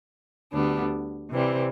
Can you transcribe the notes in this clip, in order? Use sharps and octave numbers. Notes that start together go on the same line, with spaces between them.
D2 D3 G3 B3 D4
C3 E3 G3 C4